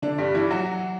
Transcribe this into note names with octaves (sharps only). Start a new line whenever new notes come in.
D3 D4
G2 G3
E3 E4
F#3 F#4